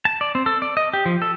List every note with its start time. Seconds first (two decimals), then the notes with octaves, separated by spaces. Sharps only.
0.05 A5
0.21 D5
0.35 C4
0.46 A4
0.62 D5
0.77 D#5
0.93 G4
1.06 F3
1.22 A4